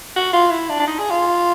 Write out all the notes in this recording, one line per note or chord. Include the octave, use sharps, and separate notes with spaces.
F#4
F4
E4
D4
D4
D#4
G#4
F4